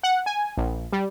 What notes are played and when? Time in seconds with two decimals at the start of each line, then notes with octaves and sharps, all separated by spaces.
0.03 F#5
0.26 G#5
0.57 A#1
0.93 G3